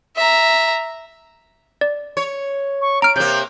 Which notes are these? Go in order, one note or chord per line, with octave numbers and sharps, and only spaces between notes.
E5 A#5
D5
C#5
C#6
A#5 F6 D7
C3 A#3 G6